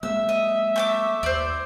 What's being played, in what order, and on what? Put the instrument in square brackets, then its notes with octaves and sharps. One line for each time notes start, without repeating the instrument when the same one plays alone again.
[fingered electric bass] G#3 A#3 [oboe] E5 [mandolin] E6
[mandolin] D#5
A3 G5 D6
[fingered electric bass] D#2 [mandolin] C5 D5